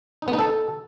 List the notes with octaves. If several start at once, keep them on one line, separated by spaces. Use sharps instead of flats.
D#4
B3
D#4
A4